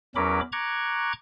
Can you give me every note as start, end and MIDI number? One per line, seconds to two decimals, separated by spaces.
0.16 0.41 40
0.16 0.41 54
0.16 0.41 61
0.16 0.41 70
0.16 0.41 83
0.16 0.41 86
0.52 1.13 82
0.52 1.13 85
0.52 1.13 86
0.52 1.13 90
0.52 1.13 92